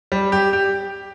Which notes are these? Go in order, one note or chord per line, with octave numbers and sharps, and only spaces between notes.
G3
G4
G4